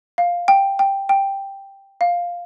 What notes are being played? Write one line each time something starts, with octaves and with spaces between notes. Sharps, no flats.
F5
G5
G5
G5
F5